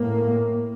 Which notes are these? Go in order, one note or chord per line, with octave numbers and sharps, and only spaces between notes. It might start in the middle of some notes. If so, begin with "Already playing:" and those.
Already playing: A2 A#3